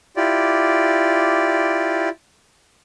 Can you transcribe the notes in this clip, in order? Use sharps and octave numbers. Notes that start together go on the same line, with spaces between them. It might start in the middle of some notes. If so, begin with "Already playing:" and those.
E4 F4 G4 D5